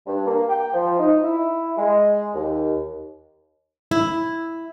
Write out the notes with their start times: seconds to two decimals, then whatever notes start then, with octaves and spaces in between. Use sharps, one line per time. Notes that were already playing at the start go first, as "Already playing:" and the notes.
0.07 G2
0.27 A#3
0.49 G5
0.74 F3
0.99 D#4
1.23 E4
1.77 G#3
2.34 D#2
3.91 E4